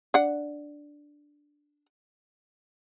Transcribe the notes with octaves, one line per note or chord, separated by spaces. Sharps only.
D4 F#5